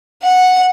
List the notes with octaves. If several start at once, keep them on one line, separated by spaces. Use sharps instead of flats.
F#5